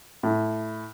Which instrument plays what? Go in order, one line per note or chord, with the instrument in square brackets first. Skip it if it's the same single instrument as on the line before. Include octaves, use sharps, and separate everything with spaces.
[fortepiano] A2